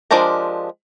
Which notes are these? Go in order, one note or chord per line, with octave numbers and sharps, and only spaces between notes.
F3 G#3 D4 G4 A#4